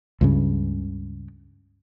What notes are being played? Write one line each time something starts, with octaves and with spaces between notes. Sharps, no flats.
C#2 G2 C#3